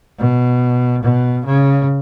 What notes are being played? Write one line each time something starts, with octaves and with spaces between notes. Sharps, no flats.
B2
B2
C#3